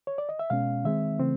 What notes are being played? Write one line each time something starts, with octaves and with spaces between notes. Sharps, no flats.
C#5
D5
D#5
E5
B2 G#3 C#4 F5
D#3 G#3 C4 E5
C#3 E3 A3 C4